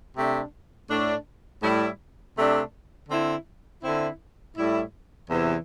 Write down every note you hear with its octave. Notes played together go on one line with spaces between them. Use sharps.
C3 A3 D4
A2 A3 D4
A2 G3 E4
C3 A3 D4
D3 C4 E4
D3 C4 E4
A2 G3 E4
E2 C3 E3